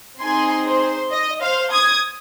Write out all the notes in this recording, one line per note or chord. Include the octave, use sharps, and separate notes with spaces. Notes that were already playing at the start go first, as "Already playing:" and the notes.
C4 D#4 G#4 G#5 C6
C5
D#5
C5 F5
D#6 G#6